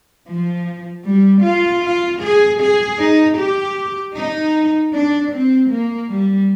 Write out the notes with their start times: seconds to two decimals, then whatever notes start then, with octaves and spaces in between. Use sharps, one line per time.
0.29 F3
1.05 G3
1.44 F4
1.83 F4
2.21 G#4
2.60 G#4
2.99 D#4
3.38 G4
4.15 D#4
4.93 D4
5.32 C4
5.69 A#3
6.09 G3